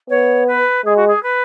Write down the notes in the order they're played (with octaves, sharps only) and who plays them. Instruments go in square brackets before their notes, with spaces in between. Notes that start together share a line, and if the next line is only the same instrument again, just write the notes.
[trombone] B3 [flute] C#5
[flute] B4
[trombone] G#3 [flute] G#4
[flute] F#4
G#4
B4